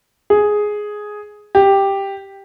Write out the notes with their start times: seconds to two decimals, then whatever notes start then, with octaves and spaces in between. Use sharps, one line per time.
0.30 G#4
1.55 G4